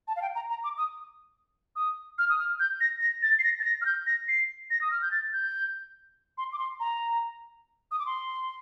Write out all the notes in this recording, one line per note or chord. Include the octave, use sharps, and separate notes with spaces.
A5
F5
G5
A#5
A#5
D6
D#6
D#6
F6
D#6
F6
G6
A#6
A#6
A6
C7
A#6
A6
A#6
F6
G6
A#6
C7
A#6
D#6
F6
G6
A6
G6
C6
D6
C6
A#5
D#6
D6
C6